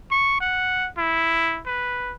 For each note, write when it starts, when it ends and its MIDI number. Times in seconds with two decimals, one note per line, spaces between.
0.11 0.38 85
0.41 0.88 78
0.98 1.60 64
1.66 2.14 71